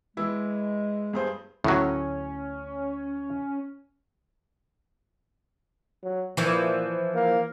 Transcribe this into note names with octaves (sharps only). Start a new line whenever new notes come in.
E3 G#3 E4
G2 G#4 C5
D2 A2 F#3 C#4
F#3
A#2 E3 F3 E4
A#3